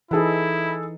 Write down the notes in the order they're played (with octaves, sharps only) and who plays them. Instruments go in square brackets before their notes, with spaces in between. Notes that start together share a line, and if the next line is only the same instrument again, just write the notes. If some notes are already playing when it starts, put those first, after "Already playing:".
[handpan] E3 D#4 [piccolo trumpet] E4 [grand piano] G#4 A4 B4